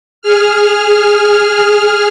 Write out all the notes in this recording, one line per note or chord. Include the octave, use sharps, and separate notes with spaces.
G#4 F6